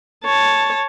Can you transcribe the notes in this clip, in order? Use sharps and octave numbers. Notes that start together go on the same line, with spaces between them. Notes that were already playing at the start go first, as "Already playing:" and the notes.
C#5 A5